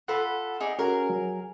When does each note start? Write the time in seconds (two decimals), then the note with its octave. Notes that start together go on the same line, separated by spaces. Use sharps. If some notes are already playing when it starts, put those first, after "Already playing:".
0.08 F4 A4 B4 F#5
0.60 D#4 G#4 D5
0.79 C#4 F#4 G#4 A#4
1.10 F#3